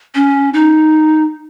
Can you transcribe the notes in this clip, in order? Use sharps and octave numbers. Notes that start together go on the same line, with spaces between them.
C#4
D#4